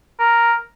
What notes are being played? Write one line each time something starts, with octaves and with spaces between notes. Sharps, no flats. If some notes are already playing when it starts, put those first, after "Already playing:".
A#4